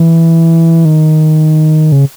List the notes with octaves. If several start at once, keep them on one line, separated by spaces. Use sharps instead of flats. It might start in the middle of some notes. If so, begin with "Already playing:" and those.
Already playing: E3
D#3
C#3